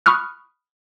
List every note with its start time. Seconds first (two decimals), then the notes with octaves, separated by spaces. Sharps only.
0.06 B5 C#6 D#6 F6 F#6